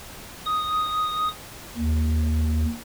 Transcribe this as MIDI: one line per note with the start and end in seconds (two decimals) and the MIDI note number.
0.46 1.28 87
1.77 2.65 39